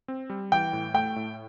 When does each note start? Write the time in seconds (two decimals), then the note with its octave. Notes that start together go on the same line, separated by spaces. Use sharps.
0.08 C4
0.30 G3
0.52 E3 G5
0.73 A2
0.94 A3 G5
1.16 A2